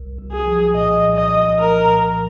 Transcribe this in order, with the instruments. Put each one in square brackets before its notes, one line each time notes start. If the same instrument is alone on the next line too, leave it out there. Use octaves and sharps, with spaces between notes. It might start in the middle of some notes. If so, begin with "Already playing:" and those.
Already playing: [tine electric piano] C2
C2
[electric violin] G#4
[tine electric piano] F3
[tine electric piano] A#2 [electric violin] D#5
[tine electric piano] C2
[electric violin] D#5
[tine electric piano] C2
[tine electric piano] F3 [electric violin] A#4
[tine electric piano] A#2